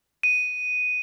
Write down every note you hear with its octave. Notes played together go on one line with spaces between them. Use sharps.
D#7